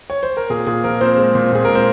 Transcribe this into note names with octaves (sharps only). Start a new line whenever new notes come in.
C#5
C5
A#4
A#2 G#4
A#2 G#4
F3 A#4
A#2 C4 C5
G#3
A#2
A#2 G#4
G#3 A#4
C5